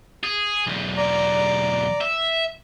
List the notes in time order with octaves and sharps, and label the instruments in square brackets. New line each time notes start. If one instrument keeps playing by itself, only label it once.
[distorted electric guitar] G#4
B1 E2
[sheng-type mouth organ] D5 A#5
[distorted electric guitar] E5